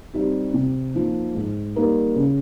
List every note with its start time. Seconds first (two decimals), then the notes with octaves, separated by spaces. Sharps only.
0.14 G3 C4 D#4 G4
0.54 C3
0.94 F3 A#3 D#4
1.35 G#2
1.76 G3 A#3 D#4 A#4
2.16 C#3